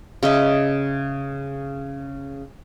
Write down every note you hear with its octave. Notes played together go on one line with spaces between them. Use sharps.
C#3 D#5 E5